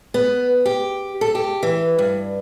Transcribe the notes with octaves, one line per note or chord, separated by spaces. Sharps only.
B3
G4
A4
G4
E3
G2